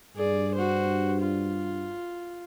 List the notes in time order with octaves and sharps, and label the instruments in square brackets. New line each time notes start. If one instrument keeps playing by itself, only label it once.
[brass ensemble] G2 [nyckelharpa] G#4 D5
[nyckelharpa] F#4 C5
F4